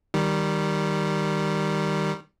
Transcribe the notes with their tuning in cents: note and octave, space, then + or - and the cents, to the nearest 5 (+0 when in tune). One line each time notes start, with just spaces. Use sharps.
D#3 +0 G3 +0